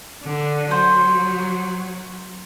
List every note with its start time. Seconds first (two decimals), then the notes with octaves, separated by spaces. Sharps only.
0.24 D3
0.71 F#3 C5